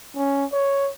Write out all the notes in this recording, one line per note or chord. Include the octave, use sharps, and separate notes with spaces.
C#4
C#5